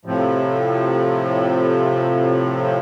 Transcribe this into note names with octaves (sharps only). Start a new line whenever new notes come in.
A2 C3 F3